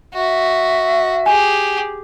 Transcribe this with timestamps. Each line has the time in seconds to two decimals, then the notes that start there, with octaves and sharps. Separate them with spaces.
0.14 F#4 E5
1.26 G4 G#4 G#5